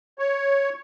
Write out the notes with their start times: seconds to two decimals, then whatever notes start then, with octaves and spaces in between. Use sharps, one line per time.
0.19 C#5